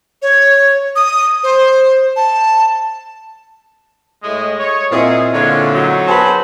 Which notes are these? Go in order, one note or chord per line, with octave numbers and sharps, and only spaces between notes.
C#5
D#6
C5
A5
A2 G#3 D#5
C#5
A#2 C4 E4 G#4 D#5 F5
A#2 D3 G#3 C#4 F4 C#5
F#3 D#4
B3 G#4 B4 C5 A5